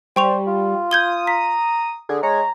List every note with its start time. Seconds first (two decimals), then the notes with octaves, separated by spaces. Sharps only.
0.16 G3 C5 G5 C#6 F7
0.47 F4
0.91 D#6 G6 G#6 G7
1.27 A#5 B6
2.09 D3 G#4
2.23 G#3 C#5 A#5